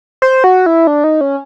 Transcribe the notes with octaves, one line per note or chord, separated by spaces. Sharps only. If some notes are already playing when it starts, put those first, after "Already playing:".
C5
F#4
E4
D4
D#4
C#4